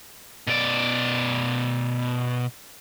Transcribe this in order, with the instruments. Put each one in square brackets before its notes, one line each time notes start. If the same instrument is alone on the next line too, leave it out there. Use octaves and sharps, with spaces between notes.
[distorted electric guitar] B2 D5